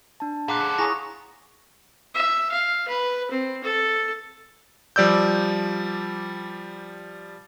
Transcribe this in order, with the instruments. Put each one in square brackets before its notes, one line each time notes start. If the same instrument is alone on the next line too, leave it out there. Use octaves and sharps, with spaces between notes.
[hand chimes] D4 A5
[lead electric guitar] A#2 [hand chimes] G#4 F5 F#5 [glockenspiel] C6 D6 F#6
[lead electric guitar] C#4 A4
[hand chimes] E4 [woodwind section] G#4 C#6 [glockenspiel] G#5 A#5 A#6
[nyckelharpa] E5
F5
B4
C4
A4
[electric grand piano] F3 G3 D5 E6 G6